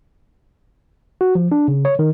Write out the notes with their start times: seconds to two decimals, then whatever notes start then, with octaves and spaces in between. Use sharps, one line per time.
1.21 F#4
1.35 F3
1.52 D4
1.68 C#3
1.85 C#5
1.99 D#3